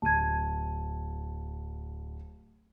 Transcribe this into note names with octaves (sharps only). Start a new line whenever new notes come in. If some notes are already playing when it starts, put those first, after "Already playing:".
D1 A5 G#6 D#7